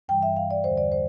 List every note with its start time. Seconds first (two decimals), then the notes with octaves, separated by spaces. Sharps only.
0.09 G2 E3 G3 G5
0.22 E5
0.36 F5
0.51 D5
0.64 E2 D3 G3 C5
0.77 D5
0.92 C5